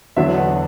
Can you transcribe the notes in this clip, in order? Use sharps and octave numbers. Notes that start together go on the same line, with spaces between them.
E2 D3 F#3 B3 D4 E5
F#5